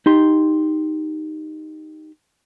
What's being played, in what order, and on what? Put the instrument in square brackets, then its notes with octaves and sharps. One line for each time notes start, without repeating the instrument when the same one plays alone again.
[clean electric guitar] D#4 G4 C6